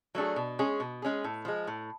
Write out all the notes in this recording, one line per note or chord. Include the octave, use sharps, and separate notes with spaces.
F#3 A3 D4 G#4
B2
G#3 C#4 G#4
B2
G#3 C#4 G#4
A2
F3 G#3
A2